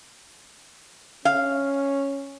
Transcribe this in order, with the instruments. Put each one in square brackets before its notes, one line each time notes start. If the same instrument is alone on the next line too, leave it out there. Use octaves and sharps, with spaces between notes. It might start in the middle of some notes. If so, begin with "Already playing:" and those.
[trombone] C#4 [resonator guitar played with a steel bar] F5